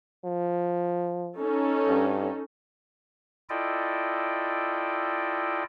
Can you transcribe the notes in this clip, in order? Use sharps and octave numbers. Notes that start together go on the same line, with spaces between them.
F3
C#4 D#4 A4
G2
E4 F4 A4 D5 D#5 G5